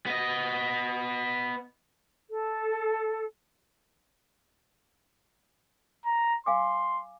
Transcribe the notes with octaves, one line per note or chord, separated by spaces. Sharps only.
B3 D#5
A4
A#5
F5 G#5 C6 D6